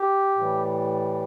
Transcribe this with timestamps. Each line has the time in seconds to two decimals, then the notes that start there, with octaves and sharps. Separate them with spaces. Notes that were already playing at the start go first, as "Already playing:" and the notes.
Already playing: G4
0.36 A2 E3 G3